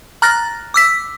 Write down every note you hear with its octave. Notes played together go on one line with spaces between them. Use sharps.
A#5 F6 F#6 A6 A#6
D6 E6 B6